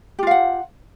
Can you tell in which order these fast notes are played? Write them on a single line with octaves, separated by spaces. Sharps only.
G4 F4 F5 F#5